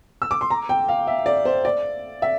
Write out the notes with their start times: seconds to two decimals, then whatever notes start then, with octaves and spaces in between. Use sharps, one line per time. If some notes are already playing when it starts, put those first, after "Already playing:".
0.22 E6
0.31 D6
0.41 C6
0.50 A#5
0.69 G5
0.89 F5
1.07 E5
1.26 D5
1.45 C5
1.65 D5
2.22 E5